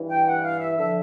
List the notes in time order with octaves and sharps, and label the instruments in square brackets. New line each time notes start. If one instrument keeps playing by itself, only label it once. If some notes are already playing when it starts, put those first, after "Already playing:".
Already playing: [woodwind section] G2 E3
G5
F#5
F5
E5
D3 F3 E5